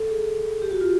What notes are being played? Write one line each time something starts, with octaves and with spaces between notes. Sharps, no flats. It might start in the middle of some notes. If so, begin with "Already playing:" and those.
Already playing: A4
G#4
G4
F#4
F4